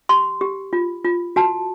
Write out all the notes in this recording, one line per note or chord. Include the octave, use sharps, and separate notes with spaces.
G4 C6
G4
F4
F4
F#4 A5